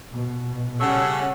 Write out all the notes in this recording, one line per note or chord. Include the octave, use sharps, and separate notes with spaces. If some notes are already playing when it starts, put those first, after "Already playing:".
B2
C#3 G3 C#4 A4 F#5 C#6 E6